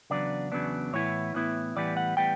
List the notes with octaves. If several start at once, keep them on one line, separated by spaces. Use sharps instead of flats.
E2 C#3 F#3 B3 D4 D5
E2 C#3 F#3 B3 D4
A2 E3 B3 E4 C#5
A2 E3 B3 E4
A2 E3 G3 B3 D5
F#5
A2 E3 G3 B3 G5